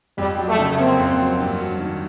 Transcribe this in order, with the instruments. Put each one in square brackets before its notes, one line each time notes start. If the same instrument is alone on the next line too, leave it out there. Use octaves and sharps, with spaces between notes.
[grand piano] F2 [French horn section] G3
[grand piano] F#3
[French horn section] A3
[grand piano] C#3
[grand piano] A#3 [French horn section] C4
[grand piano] F2
F#3
G2
F#3
D#3